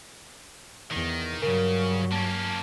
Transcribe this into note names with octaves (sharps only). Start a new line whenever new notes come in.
E2 D#3
G2 C#3 F#3 A#4
A#3 C#4 A5